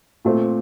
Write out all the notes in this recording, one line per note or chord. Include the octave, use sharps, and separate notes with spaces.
A#2 A3 C4